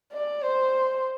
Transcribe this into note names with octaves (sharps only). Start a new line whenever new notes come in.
D5
C5